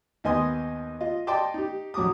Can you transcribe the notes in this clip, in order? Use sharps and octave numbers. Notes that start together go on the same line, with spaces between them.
D#2 B3 D#5 G#5 C6 D#6
F4 D#5
D5 D#5 G5 A5 C6 D6
D#4 G4
A#1 F#3 F#4 D6 D#6